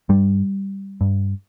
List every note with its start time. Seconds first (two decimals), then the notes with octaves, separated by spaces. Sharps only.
0.09 G2 G3
1.01 G2